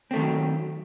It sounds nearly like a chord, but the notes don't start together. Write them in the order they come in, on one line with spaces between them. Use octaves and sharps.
C4 A3 D#3 G3 F#3